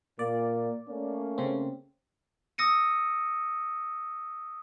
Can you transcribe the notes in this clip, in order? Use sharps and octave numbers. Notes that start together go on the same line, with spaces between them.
A#2 A#3 D5
A3 A#3 C#4
C#3 C4
D#6 E6 A#6 C#7 D#7